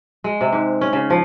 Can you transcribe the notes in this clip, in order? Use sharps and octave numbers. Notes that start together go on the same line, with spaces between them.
G#3
C3
G#2
C#4
C#3
F3